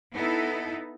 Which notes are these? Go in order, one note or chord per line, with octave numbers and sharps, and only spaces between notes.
B3 D#4 E4 A4